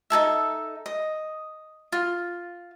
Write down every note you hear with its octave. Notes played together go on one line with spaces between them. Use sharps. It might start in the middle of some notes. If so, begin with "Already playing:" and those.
D#4 G#4 A4 E5
D#5
F4